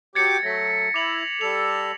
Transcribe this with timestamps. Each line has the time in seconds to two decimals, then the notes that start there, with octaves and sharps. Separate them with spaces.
0.15 F#3 G4 D6 G#6 A6 C#7
0.43 F#3 A3 A#6 B6
0.94 E4 D6 F7 F#7
1.41 G3 A4 F7